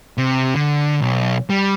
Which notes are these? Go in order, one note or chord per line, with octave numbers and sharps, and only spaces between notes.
C3
D3
B1
G3